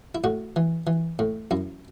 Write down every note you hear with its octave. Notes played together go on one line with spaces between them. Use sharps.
E4
A2 F#4
E3
E3
A2
F#2 E4